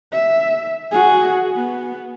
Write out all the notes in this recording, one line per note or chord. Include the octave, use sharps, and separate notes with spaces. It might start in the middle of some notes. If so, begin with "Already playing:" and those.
E5
F#4 G#4
B3